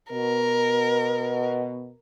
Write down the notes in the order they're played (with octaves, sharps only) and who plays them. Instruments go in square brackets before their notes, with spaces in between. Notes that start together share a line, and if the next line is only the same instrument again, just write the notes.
[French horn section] B2 [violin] A#4